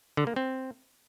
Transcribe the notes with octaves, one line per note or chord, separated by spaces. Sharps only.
D3
A#3
C4